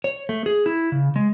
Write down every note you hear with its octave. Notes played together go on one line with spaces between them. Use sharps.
C#5
A3
G#4
E4
C#3
G#3